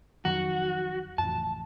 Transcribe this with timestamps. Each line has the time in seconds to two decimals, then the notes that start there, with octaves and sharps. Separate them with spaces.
0.25 F2 D#3 F#3 F#4
1.18 A1 F2 A5